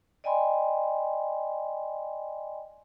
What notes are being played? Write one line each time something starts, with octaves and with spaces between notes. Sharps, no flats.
D5 D#5 G5 G#5 B5 C6